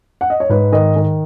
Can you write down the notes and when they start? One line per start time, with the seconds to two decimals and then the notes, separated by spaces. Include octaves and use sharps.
0.21 F#5
0.30 D#5
0.40 C#5
0.49 G#2 B4
0.72 D#3 D#5
0.96 D#3